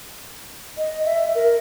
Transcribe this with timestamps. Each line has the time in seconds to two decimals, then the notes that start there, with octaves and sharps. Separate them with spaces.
0.77 D#5
1.05 E5
1.35 A#4